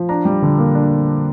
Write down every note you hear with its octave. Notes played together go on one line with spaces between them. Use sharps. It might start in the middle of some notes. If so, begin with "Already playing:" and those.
Already playing: F3
D4 A#5
G3
D3
A#3
D4